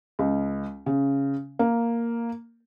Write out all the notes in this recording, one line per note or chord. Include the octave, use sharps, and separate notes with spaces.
C#2
C#3
A#3